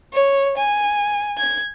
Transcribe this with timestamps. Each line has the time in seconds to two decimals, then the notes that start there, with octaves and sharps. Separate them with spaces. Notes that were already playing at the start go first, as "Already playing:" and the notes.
0.14 C#5
0.57 G#5
1.37 G#6